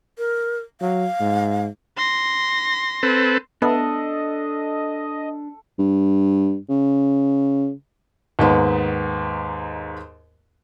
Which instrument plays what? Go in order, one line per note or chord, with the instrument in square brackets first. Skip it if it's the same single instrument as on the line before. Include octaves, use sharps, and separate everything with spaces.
[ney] A#4
[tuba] F#3 [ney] F5
[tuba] G#2
[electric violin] C6 A#6
[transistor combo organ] C4 A4 B4
[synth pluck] B3 [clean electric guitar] D4 [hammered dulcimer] A4 [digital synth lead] D#5
[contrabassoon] G2
C#3
[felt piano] D#2 G#2 B3